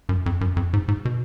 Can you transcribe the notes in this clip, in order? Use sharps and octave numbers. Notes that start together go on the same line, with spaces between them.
F#2
F2
F#2
F2
G#2
G#2
B2